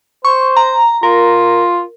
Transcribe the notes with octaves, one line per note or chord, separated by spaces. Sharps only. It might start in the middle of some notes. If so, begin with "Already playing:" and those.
C5 C#6
A#5
F4 A#4